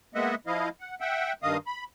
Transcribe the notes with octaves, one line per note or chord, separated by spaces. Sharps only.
G#3 A#3 B3 D#5 E5 F#5
F3 E4 D#5 F5
F#5
E5 F#5 G5
G2 D#3 D#5 F5 D#6
B5